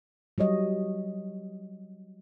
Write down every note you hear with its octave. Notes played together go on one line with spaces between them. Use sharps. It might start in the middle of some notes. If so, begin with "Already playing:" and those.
F#3 G3 C#5 D#5